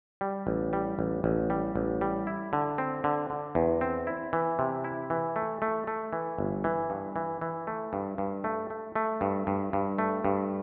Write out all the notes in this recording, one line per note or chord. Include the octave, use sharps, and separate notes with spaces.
G3
A1
G3
A1
A1
G3
A1
G3
E4
D3
C4
D3
D3
E2
C4
E4
E3
C3
E4
E3
A3
A3
A3
E3
G1
E3
G2
E3
E3
A3
G2
G2
A3
A3
A3
G2
G2
G2
A3
G2